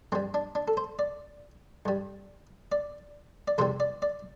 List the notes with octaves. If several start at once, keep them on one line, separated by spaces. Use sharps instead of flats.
G2 G3 C4
D4
D4
A4
C5
D5
G2 G3
D5
D5
E2 C3 E3 G3 C5
D5
D5